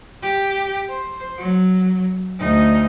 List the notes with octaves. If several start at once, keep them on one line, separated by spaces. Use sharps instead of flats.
G4
C5
F#3
D2 D#4